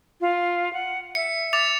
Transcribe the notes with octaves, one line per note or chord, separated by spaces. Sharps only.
F4
F#5
E5 C#7
D6 A6 F7